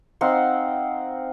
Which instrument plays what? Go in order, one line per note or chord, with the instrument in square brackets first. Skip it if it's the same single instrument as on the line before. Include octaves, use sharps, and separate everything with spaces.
[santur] C4 D#4 F5 F#5